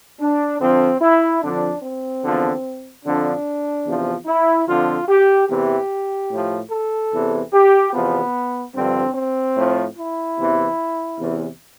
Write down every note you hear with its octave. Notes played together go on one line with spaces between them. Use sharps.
D4
F2 D3 F3 C4
E4
F2 D3 F3 D4
C4
E2 D3 F3
F2 D3 F3 D4
E2 C3 F3
E4
F2 D3 F3 F4
G4
E2 C3 E3 G4
A2 F3
A4
E2 C3 E3
G4
E2 C3 F3 B3
G2 D3 F3 C4
C4
A2 F3
E4
E2 C3 E3
E2 C3 E3